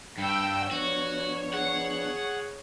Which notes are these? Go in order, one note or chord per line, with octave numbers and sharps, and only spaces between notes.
G2 F5 G5 B5 E6
F3 B3 D4 F#4 C#5
G#4 F#5